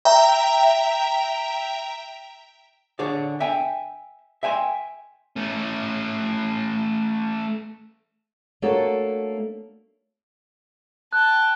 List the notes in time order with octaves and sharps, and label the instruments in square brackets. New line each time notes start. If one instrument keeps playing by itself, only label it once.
[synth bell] E5 G5 A#5
[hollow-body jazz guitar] D3 G#4 C#5 D5
E5 G5 G#5
E5 G5 G#5 C6
[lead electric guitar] A3 C#4
[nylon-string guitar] A3 A#3 D4 F#4 A4 C#5
[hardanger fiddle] G5 A5 [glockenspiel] F#6